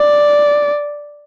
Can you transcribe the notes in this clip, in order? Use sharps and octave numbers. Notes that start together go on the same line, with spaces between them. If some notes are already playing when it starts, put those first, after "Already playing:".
Already playing: D5